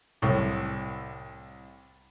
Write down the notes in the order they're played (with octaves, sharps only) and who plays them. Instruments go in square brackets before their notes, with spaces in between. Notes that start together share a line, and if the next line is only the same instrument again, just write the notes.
[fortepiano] C2 A2